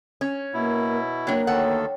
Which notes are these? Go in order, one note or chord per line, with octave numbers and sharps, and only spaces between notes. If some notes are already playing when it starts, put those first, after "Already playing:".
C#4
B2 A#3 E4
F#3 A#3 D4 C#5 G5
D2 D#3 A4 F#5